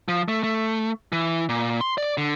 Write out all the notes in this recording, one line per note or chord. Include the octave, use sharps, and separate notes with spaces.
F3
A3
A3
E3
A#2
C6
D5
D3